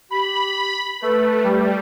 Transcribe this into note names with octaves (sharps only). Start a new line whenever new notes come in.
G4 B5
A3 B4
G3